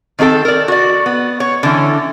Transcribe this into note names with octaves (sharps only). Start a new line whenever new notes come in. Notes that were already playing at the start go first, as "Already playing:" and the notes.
D#3 C4 D4 A4 G5
A#4 D5
F#4 D5
B3
C#5
D3 E3 C#4